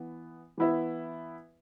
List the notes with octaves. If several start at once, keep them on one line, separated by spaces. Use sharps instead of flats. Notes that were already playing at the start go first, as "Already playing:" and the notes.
Already playing: E3 B3
E3 B3 E4 B4 E5